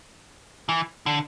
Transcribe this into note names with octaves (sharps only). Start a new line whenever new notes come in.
E3
D3